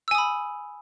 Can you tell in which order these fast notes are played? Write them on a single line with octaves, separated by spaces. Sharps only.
E6 G#5 D#6 B5